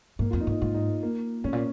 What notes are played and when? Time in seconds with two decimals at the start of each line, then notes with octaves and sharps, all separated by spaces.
0.19 G#2 A#3
0.31 F2 F4
0.41 D#4
0.47 G#2
0.51 D#4
0.62 G#2 F4
0.74 D#4
1.03 A#3
1.44 G#2 C#4
1.53 A#2